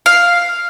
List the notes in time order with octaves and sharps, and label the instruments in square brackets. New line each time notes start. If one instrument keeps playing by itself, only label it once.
[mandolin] F5